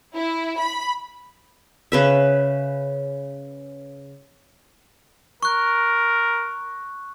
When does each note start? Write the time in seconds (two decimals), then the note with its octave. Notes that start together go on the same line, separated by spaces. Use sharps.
0.15 E4
0.58 B5
1.92 C#3 B4 E5
5.43 A#4 C#6 F#6